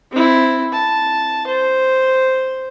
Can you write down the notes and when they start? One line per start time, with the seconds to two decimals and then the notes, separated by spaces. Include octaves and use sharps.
0.11 C4 E4
0.72 A5
1.47 C5